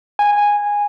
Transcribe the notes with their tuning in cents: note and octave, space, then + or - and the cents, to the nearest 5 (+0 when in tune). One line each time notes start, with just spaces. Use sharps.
G#5 -10